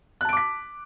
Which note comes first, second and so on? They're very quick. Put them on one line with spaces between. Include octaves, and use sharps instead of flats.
F#6 A5 D7 D6 B6